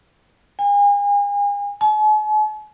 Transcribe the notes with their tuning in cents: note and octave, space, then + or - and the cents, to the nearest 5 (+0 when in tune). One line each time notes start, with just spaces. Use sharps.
G#5 -40
G#5 +45